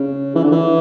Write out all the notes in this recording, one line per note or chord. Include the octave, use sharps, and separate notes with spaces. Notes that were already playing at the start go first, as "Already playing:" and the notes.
Already playing: C#3
E3
D3
E3